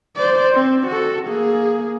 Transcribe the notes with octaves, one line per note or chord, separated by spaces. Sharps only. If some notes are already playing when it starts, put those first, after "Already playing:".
C5 D5
C4
F#4 A4
A#3 G#4